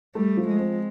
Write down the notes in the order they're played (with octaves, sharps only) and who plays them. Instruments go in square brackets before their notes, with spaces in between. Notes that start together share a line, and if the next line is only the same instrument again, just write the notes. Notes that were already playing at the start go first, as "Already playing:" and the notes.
[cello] G3 [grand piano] A3
[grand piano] F3
[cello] G#3
[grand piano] C4